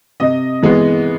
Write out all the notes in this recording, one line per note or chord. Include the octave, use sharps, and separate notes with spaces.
C3 D#5
E3 G#3 B3